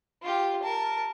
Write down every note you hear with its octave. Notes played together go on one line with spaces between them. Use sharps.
F4 G4
A#4 A5